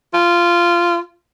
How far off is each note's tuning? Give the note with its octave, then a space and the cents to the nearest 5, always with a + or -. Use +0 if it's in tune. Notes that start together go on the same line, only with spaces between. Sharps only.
F4 -15